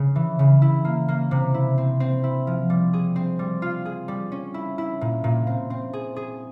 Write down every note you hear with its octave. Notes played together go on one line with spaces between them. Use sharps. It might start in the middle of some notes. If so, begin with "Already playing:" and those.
Already playing: C#3
E3
C#3
E4
A#3
A#3
C3
E4
C4
C4
E4
F3
G3
G#4
C4
G3
F4
G#4
G3
C#4
E4
E4
A#2
A#2
C4
C4
G#4
G#4